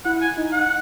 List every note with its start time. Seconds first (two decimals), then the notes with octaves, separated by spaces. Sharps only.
0.05 E4 F#5
0.21 G#5
0.37 D#4
0.53 F#5